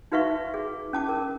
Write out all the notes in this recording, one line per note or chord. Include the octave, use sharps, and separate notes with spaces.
D#4 F#4 B4 E5 F5 C#6
G#4
C#4 A5 D6
A#4